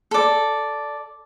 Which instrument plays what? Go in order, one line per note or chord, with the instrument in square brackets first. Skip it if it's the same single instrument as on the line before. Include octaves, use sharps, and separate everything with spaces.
[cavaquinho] A4 D5